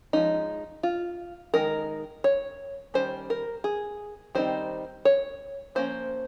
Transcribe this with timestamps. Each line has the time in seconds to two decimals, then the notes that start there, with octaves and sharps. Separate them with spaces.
0.13 F3 G#3 C#4 D#4
0.83 F4
1.54 D#3 G#3 D#4 A#4
2.24 C#5
2.94 D#3 G3 C#4 C5
3.30 A#4
3.64 G#4
4.35 D#3 G3 C4 D#4 C5
5.05 C#5
5.75 F3 A#3 C#4 C5